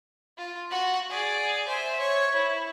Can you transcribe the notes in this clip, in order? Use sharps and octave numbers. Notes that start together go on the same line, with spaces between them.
F4
F#4 F#5
G#4 D5
C5 E5
C#5
E4